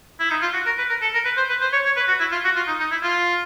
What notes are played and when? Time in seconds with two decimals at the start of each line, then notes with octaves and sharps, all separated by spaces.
0.20 E4
0.30 D#4
0.42 F4
0.54 F#4
0.66 A#4
0.78 B4
0.89 A#4
1.02 A4
1.14 A#4
1.25 B4
1.37 C5
1.49 B4
1.61 C5
1.73 C#5
1.85 C#5
1.97 B4
2.08 F#4
2.20 E4
2.32 F4
2.44 F#4
2.56 F4
2.67 D#4
2.79 D#4
2.91 E4
3.03 F4